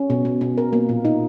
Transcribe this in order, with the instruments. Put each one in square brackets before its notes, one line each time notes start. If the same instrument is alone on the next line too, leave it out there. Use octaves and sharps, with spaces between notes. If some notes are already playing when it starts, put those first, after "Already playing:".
Already playing: [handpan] C#4
B2
B2
B2
A#4
A#3
A#2
D#4